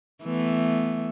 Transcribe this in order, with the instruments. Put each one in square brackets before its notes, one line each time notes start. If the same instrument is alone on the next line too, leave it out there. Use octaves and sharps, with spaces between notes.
[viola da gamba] E3 A3 B3